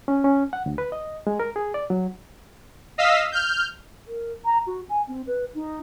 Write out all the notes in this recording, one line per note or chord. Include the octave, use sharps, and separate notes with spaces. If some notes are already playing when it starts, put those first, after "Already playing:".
C#4
C#4
F#5
D2
B4
D#5
G#3
A#4
G#4
D5
F#3
D#5 F5 E6 B6
F6 G6
A#4
A#5
F#4
G#5
C4
B4
D#4